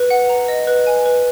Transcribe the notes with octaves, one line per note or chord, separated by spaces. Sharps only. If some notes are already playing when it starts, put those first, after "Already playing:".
Already playing: B4
F#5
A#5
D#5
B4
G#5
B4